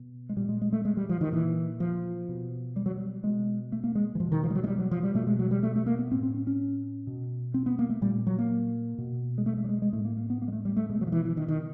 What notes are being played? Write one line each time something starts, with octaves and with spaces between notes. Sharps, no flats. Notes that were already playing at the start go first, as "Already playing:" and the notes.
Already playing: B2
G#3
A#2 G3
G#3
G#3
A3
G#3
G3
F3
D#3
A#2 E3
F3
B2
G3
F#3
G3
B2 G#3
A3
A#3
G#3
E3
B2 F3
D#3
F3
G3
F#3
G#3
G3
F#3
F3
G3
B2 A3
G#3
F#3
G3
A3
A3
A#3
B3
A2 C4
C4
C#4
C#4
B2
C4
B3
A#3
A3
A#2 G3
F#3
A#3
B2
G#3
A3
G#3
G3
G#3
G#3
A2 A3
A#3
A#3
B3
A#3
G#3
A3
G3
A3
B2 G#3
F#3
F3
E3
E3
D#3
D#3